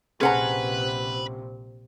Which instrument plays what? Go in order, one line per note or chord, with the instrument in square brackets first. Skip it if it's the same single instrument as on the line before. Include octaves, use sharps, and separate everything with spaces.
[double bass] A#1 C3 [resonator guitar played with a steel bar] C#4 F#5 A#5 [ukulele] G#4 C5 [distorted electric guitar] B4